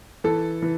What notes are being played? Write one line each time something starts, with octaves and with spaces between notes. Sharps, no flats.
E3 A4
E3